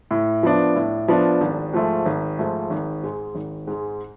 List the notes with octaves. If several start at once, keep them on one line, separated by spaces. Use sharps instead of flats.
A2
F3 B3 D4
A2
F3 B3 D4
G#1
G#2 F3 A3
G#1
G#2 F3 A3
G#1
G#2 G#3
G#1
G#2 G#3